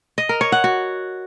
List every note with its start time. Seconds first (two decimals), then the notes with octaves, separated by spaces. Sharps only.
0.18 D#5
0.29 A#4
0.41 C#5
0.52 F#5
0.64 F#4